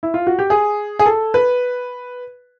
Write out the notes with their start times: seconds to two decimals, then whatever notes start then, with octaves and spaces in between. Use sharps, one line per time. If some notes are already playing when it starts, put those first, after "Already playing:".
0.03 E4
0.14 F4
0.27 F#4
0.39 G4
0.50 G#4
0.99 G#4
1.06 A4
1.34 B4